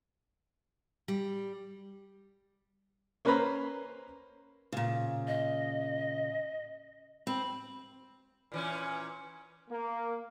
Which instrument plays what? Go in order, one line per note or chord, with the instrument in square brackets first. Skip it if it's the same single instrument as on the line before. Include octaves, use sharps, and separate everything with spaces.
[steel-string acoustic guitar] G3
[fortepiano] A#3 C#4 B4 C5 A#5 B5
[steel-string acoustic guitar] A#2 C#3
[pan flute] D#5
[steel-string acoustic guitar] C4 [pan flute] B5
[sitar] A#2 E3 C#4
[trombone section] A#3